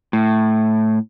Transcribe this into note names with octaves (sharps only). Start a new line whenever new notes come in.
A2